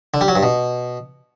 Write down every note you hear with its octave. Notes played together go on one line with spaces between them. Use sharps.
D3
G3
F#3
G2
B2